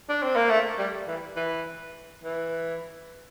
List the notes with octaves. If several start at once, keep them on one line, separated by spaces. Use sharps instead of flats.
D4
C4
A#3
A3
G3
E3
E3
E3